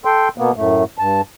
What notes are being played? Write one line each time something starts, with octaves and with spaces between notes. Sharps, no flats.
A4 G5 C6
B2 A#3 B3
F#2 A2 A3
G2 A5